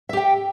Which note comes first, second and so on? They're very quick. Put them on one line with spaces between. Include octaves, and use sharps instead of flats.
E5 G4 G5